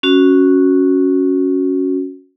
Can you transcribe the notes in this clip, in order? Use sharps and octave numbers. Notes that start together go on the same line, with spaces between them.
C#4 F#4